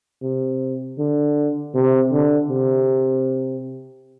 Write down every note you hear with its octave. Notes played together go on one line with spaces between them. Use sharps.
C3
D3
C3
D3
C3